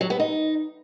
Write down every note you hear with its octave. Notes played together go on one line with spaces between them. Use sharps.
F#3
B3
D#4